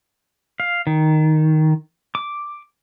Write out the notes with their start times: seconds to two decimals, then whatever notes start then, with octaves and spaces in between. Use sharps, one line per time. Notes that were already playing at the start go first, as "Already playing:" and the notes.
0.60 F5
0.87 D#3
2.15 D6